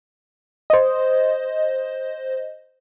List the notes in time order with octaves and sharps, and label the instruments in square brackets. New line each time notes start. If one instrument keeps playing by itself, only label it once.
[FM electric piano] C5 D#5